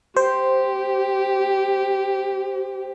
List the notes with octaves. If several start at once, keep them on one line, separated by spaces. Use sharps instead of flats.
G4 C5